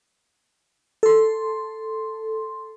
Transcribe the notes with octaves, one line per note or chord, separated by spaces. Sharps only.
A4 C6